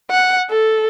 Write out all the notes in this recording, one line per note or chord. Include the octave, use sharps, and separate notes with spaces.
F#5
A4